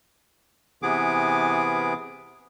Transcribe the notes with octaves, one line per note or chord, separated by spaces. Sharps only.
C3 E3 B3 G#4 D6